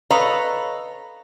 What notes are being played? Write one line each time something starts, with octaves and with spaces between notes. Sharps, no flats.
A4 B4 C#5 D#5 F5 A#5